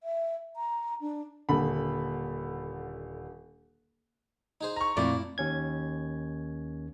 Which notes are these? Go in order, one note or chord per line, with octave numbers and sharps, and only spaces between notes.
E5
A#5
D4
D#1 D3 B5
D#4 G#4 C5
A#5 C#6
F2 A#2 A3 E4 D5
D#2 C#4 G#6